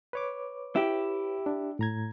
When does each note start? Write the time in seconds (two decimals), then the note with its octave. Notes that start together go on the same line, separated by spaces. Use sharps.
0.13 B4 C#5 D6
0.76 E4 G4
1.46 D4
1.79 A2 A#5 G#6